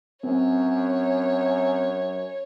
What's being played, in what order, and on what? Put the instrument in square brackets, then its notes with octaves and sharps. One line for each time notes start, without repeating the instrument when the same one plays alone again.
[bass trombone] F#2 [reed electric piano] C4 [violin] C#5